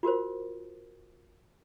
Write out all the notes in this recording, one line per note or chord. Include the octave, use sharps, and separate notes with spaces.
F4 F#4 A#4 C5